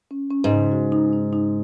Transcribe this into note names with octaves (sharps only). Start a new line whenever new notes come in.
C#4
C#4
G#2
C#3
F#4
D#4
D#4
D#4